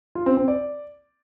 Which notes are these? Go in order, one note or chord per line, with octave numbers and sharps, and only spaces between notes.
F4
C4
C4
D5